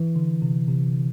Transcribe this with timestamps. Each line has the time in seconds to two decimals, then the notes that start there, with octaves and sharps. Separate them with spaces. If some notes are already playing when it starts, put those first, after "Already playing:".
Already playing: E3
0.16 D3
0.42 C3
0.68 C3